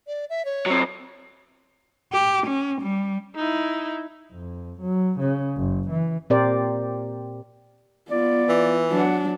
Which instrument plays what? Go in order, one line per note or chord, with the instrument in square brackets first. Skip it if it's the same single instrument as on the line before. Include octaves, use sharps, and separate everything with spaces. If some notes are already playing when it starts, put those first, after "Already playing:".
[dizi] D5
E5
C#5
[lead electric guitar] F#3 C4
[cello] G4
C#4
G3
[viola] D#4 E4
[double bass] F2
F#3
C#3
F#1
E3
[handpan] A#2 C4 G4 A#4 C5 D5
[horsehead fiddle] B3 F4 [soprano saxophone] D5
[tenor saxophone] E3
[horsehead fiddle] F#3 D4 [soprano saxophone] F#5